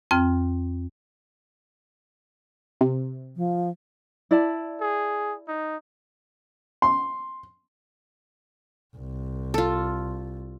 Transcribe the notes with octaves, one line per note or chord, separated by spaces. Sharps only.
F2 C4 G5 F6
C3
F3
E4 D5 A5
G#4
D#4
C6
C2
F4 A4